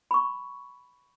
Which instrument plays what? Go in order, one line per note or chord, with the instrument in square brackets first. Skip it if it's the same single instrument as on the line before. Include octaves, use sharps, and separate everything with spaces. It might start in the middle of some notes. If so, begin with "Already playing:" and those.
[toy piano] B5 C#6